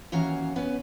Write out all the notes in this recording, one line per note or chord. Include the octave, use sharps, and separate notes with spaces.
D#2 E3 C#4 F#4 F5 A#5
B3 C#4 B4